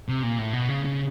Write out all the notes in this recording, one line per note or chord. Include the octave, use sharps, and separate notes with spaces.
C3
A#2
A2
B2
C#3
C#3